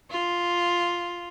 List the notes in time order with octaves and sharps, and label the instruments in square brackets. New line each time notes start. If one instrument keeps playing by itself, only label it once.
[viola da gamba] F4